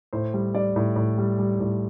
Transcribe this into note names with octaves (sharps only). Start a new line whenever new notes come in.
A2 C5
G3
G3 D5
A2
A2
G3
G3
A2